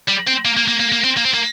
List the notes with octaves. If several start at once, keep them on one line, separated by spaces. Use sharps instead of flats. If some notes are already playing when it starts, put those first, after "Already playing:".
G3
C4
A#3
A#3
A#3
A#3
A#3
C4
A#3
C4
A#3